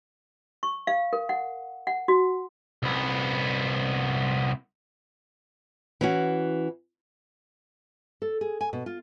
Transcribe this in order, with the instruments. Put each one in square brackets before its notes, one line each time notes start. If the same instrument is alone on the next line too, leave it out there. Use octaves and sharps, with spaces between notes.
[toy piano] C#6
F5
A#4
F#5
F#5
F#4
[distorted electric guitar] C2 B3
[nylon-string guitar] E3 C#4 F#4
A4
G#4
G#5
B2
F4